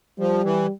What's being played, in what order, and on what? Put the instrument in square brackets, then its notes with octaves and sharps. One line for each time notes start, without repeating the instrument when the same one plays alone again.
[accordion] F3 [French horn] G3
[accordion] E3